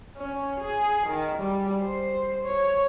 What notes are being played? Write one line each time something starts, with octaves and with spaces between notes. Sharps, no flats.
C#4
G#4
D#3
G3
C5
C#5